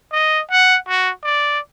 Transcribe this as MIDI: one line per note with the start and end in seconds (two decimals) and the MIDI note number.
0.12 0.41 75
0.51 0.77 78
0.88 1.10 66
1.24 1.59 74